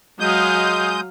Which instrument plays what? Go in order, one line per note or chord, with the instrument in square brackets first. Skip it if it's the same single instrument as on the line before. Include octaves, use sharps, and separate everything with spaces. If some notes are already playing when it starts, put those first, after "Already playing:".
[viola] F#3 F5 [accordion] G#3 D#6 G6